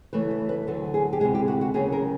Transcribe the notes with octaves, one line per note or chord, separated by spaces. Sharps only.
C#3 E3 A3 B4
B4
B4
D2 D3 F#3 A4
G#4
G4
D2 C3 E3 G#3 G#4
G4
F#4
F#4
D#2 C#3 F#3 A#3 C#4 G#4
A#4